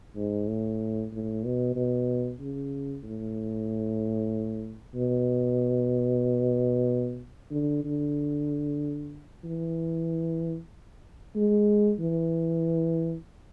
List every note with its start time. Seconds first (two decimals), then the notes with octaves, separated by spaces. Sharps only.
0.16 G#2
0.48 A2
1.12 A2
1.44 B2
1.76 B2
2.40 C#3
3.04 A2
4.95 B2
7.51 D3
7.84 D3
9.44 E3
11.35 G#3
12.00 E3